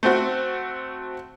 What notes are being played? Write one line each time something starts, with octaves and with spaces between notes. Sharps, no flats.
A3 C4 F#4